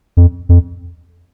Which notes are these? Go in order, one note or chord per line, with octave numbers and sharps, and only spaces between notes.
F2
F2